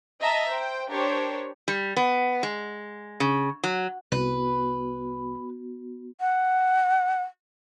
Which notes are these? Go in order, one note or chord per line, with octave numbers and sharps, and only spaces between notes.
D#5 E5 A5 A#5
C5 G5
D4 G4 A#4 C5 C#5
G3
B3
G#3
C#3
F#3
C2 B3 F#4 B4
F#5